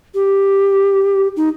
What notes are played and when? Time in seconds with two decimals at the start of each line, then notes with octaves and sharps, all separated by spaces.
0.15 G4
1.36 D#4